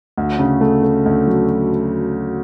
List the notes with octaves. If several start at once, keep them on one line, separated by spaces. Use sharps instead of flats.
D2
C#3
A3
A3
D2
F#3